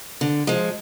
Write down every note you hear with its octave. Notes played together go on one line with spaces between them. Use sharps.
D3
F3 G#3